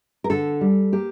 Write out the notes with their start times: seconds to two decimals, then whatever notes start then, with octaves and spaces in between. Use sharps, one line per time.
0.24 A#4
0.30 D3 A4
0.61 G3
0.92 A#3 G4